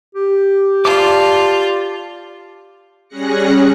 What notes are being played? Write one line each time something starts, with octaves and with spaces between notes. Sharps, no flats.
G4
F4 D5 A5 D6
G3 C#4 G#4 F#6 A#6 C#7